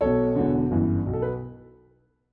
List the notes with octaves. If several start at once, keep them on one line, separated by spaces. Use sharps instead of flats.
B1 B2 A4 C#5
E1 E2 D3
G1 F#2 E3
B1 B2
A4
B4